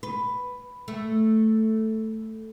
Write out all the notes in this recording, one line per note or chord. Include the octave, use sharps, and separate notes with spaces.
B4
A3